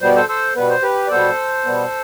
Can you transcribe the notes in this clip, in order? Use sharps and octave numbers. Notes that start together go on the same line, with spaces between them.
B2 G3 B3 C5
D5
A4 C5
A4 C5
B2 G3 B3 B4
C5
G4 B4
D5
B2 G3 B3 A4 C5
B2 G3 B3